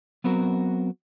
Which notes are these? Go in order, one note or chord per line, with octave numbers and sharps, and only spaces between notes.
F#3 B3 C4 F#4 A#4